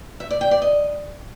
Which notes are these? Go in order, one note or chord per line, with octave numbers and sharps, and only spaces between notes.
E5
D5
G5
D5
D#5